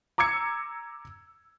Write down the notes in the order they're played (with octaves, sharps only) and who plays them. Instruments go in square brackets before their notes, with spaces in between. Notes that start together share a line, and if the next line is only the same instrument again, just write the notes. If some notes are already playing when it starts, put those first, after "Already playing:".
[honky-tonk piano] A#5 D6 E6 G#6 C#7